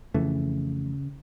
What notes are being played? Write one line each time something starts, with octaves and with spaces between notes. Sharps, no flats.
F2 C#3 E3 A3